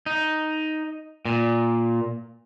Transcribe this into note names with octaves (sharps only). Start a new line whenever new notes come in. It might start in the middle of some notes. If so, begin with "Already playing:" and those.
D#4
A#2